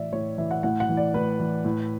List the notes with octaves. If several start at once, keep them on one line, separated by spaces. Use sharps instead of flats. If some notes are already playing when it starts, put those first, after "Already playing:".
Already playing: A2 E3 D5 E5
A2 C#5
E3 E5
F#5
A2 F#5
F#5
E3
D5
A2 B4
E3
A2